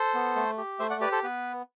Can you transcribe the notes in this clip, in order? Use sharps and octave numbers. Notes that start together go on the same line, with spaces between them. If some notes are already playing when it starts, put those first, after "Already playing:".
Already playing: A4 C5
B3
A3
G4
A3 C5 E5
D5 F#5
G4 B4 D5
A4 C5
B3 B4